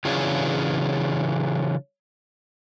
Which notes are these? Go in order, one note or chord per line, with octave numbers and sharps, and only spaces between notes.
C#3 E3 F#3 D4 F4 G#4